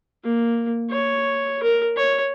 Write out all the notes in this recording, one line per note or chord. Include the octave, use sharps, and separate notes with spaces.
A#3
C#5
A#4
C#5